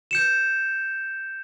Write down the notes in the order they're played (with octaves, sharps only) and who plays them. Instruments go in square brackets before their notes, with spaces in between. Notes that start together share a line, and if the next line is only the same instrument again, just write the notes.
[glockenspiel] G6 C#7 E7